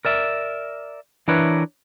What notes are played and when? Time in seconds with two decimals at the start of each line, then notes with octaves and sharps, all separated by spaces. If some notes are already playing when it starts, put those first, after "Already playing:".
0.05 A#4 D5 E5
1.28 E3 D4 E4 A#4 B4 C#5